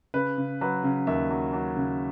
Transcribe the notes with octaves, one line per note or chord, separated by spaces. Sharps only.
C#3 B4
C#3
F#3 B4
C#3
D#2 E5
F#3
F#3
C#3